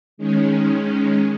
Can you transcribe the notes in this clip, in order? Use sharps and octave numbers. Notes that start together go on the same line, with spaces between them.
D#3 G#3 C#4